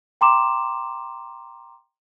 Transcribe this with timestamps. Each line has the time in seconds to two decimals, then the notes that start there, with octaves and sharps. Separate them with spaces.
0.21 G5 A#5 C6 D6 E7